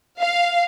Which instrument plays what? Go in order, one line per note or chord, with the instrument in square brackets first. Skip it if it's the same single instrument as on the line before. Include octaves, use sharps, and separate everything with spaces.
[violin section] F5